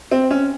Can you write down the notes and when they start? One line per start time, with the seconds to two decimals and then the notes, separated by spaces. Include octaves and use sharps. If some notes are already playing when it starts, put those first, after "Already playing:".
0.12 C4
0.31 C#4